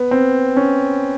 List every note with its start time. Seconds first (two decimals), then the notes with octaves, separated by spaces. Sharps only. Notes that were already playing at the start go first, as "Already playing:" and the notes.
Already playing: B3
0.11 C4
0.57 C#4